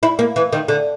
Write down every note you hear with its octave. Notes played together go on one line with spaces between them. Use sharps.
E4
A#3
E3
D#3
D3